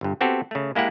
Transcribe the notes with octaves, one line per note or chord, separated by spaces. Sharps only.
G1 G2
B3 C4 F#4 G4 A4
C#3 A3
G#3 A#3 E4 G4 F#5